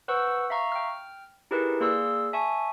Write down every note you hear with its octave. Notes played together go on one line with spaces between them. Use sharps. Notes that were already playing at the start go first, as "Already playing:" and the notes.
B4 C5 F#5 C#6 E6
E5 F5 A#5 C#6
G5 F6
D#4 E4 G4 G#4 A#4 B4
A#3 G#4 D5 C6 E6
E5 G#5 A5 C#6